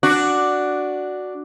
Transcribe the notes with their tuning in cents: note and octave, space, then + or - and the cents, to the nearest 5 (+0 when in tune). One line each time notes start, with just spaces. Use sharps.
D4 +0 F#4 +0